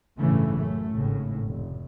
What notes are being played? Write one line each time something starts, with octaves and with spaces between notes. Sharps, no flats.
A1 G2 C#3 E3 A3
F#2 A3
G#1 A2 C#3
F1